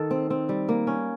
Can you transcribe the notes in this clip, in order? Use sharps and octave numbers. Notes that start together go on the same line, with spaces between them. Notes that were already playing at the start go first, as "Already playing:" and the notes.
Already playing: D#3 A4
C4
C4
G3
A#3
C#4